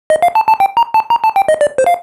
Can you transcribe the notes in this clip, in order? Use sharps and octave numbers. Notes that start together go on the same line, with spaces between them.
D#5
F5
A5
A5
G5
A#5
A5
A#5
A5
G5
D#5
D5
C5
F5